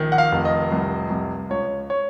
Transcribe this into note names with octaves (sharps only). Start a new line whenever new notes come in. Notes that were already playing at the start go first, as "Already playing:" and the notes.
Already playing: A#1 D#3
F#5
F5
F1
D#5
C2
C2
C#2 C#5
C#5